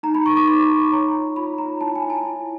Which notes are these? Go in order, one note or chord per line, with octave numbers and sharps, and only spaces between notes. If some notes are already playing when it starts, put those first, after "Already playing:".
D#4 A#5
B5
D#4 C#6
D6
D#4 C6
D#4
C#5 A#5
F4
F4 B5
C#5 A#5
E4 A5
G#5
E4
A5
E4